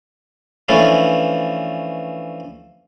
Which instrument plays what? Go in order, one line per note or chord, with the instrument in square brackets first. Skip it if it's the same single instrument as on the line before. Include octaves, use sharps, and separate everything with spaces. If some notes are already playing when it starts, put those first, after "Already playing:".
[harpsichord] E3 F3 A3 C#4 D4 B4